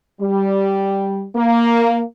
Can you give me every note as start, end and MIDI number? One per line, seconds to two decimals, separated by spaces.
0.21 1.25 55
1.36 2.01 58